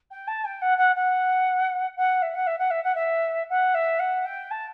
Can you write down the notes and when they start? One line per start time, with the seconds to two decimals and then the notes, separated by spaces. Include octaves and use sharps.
0.10 G5
0.27 A5
0.44 G5
0.61 F#5
0.77 F#5
0.95 F#5
1.96 F#5
2.22 E5
2.34 F#5
2.46 E5
2.58 F#5
2.70 E5
2.83 F#5
2.94 E5
3.49 F#5
3.74 E5
3.99 F#5
4.25 G5
4.50 A5